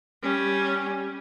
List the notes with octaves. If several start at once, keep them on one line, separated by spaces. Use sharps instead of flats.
G3 C#4